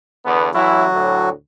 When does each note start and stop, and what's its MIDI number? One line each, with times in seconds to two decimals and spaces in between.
0.25 0.49 40
0.25 0.49 50
0.25 0.49 59
0.54 0.85 33
0.54 0.85 52
0.54 1.29 54
0.54 0.85 64
0.54 1.29 66
0.93 1.30 38
0.93 1.30 45